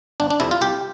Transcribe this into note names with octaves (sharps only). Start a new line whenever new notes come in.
G1 D4
D4
F2 C3 E4
F4
C2 G4